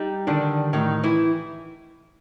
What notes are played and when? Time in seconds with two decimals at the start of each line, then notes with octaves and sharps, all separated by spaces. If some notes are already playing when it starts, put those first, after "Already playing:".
Already playing: G3 D#4
0.27 D3 D#3 D4
0.73 A2 D#3 D#4
1.04 E3 E4